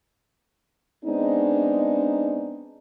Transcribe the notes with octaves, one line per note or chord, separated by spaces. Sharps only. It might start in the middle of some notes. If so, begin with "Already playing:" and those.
G#3 B3 C4 D4 D#4